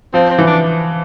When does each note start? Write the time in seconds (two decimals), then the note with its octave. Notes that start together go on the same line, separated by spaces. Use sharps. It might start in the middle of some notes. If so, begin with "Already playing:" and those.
0.14 F3 C4
0.30 C4
0.38 E3
0.46 D4